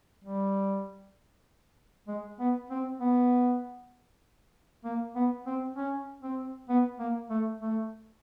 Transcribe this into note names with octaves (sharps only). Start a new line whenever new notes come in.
G3
G#3
B3
C4
B3
A#3
B3
C4
C#4
C4
B3
A#3
A3
A3